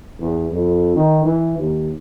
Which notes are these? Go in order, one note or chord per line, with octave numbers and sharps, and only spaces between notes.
E2
F2
D#3
E3
D#2